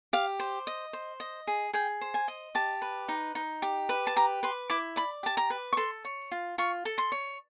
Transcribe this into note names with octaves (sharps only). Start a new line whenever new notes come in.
G4 F5
C5
D#5
C5
D#5
G#4
G#4 G5
C5
G#5
D#5
G4 A5
B4
D#4
D#4
G4
B4
A5
G4 A#5
B4 C6
E4 D6
D5 B5
G4 A5
A#5
B4
C#6
A4 C6
C#5
F4
F4 C#6
A4
C6
C#5